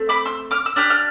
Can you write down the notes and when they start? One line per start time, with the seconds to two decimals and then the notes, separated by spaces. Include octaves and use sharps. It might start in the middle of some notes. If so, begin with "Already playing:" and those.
Already playing: A3 C4
0.09 B5 D6
0.25 C6 E6
0.51 D6 F6
0.66 E6
0.76 D4 G4 D6 F6
0.90 F6